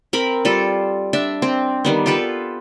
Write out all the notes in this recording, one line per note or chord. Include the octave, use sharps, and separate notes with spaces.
C4 A#4 B5
G3 F4 A4
D4 E5
C4
D#3 G3 B3
F4 G4 A4 B4